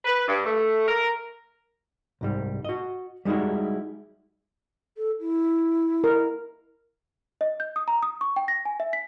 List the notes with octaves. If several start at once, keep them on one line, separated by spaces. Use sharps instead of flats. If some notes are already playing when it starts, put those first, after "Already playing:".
B4
G2
A3
A#4
C2 G#2 G3
F#4 D#5
G3 G#3 D#4 E4 F#4
A4
E4
A#4
D#5
G6
D#6
A#5
D#6
C#6
G5
A#6
G#5
E5
B6